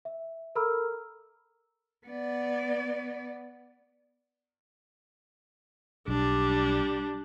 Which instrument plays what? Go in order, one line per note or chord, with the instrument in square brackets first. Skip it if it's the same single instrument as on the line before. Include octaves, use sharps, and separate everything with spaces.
[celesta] E5
A4 A#4 A#5 B5 E6 F6
[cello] B3 D5
[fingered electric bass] B1 [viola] G3 D4